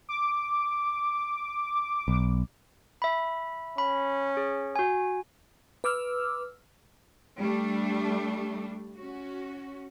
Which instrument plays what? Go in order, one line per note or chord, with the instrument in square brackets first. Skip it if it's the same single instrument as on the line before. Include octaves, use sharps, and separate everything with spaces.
[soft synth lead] D6
[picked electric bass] B1
[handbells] E5 B5
[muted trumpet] C#4 [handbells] B5
[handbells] G#4
F#4 G#5
[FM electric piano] B4 D6 E6 F6
[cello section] G3 A3 D4
C#4 F#4